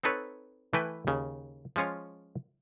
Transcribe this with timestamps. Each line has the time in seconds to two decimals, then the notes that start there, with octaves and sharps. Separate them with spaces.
0.03 C4 D#4 A4 B4 C#5
0.73 E3 A3 E4 B4 G5 G#5
1.07 D#2 C#3
1.76 F3 G#3 C#4 F4 C#5